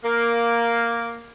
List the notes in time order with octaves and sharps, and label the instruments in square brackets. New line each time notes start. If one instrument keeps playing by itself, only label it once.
[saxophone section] A#3